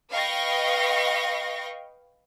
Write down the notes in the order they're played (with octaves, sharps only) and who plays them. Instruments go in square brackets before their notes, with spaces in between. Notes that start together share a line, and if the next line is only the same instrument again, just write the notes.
[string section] B4 D#5 F5 G5 C#6 A#6